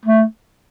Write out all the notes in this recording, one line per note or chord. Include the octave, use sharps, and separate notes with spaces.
A3